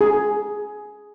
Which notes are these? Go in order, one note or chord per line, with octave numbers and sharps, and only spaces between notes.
G#4